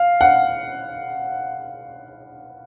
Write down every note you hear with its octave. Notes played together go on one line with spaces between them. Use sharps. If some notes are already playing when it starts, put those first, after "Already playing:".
Already playing: F5
F#5